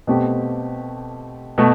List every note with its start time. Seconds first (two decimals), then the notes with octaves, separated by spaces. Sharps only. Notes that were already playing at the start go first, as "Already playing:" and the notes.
0.07 B2 A3 C4 G4
1.58 B2 A3